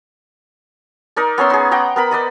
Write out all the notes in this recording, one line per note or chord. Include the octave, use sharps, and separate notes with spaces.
D#4 A#4 D5
B3 C#4 E5 C6
D#4 G#4
F#5 G5 A#5 D6
B3 A#4 B5
B4 D5 D#5